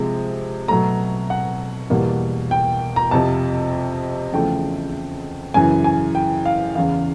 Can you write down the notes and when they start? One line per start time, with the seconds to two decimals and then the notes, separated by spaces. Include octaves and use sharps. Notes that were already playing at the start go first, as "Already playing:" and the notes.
Already playing: C3 F3 G#3
0.68 B2 F#3 A3 A#5
1.30 F#5
1.90 E2 B2 G3 A#3
2.51 G5
2.96 A#5
3.11 F2 C3 F3 A5
4.33 E2 C#3 F3 A3 G5
5.54 F#2 C#3 E3 G#5
5.84 G#5
6.15 G5
6.45 F5
6.75 E2 C#3 E3 F5